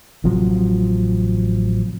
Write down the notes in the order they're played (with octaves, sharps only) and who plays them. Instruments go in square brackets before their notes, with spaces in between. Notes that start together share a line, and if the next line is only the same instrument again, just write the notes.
[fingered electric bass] A1 C3 F3 F#3